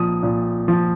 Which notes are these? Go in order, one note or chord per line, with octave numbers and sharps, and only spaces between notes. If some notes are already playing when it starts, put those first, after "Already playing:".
Already playing: A#2 F3 D#6
A#2
F3